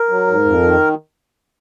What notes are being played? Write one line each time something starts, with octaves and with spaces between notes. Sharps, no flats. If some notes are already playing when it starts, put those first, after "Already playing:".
Already playing: A#4
F#3
G#2
F2
D#3